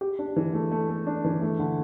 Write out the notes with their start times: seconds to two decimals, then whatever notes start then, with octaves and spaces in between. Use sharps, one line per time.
0.01 G4
0.19 D4
0.36 E3
0.54 A3
0.72 A3
0.89 A3
1.07 D4
1.24 E3
1.42 A3
1.59 D3